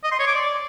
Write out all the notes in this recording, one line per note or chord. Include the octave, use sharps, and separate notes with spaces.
D#5
C6
C#5
D6
D5